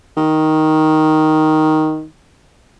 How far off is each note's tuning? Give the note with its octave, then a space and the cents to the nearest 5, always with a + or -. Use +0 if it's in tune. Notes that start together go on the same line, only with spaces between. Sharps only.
D#3 +5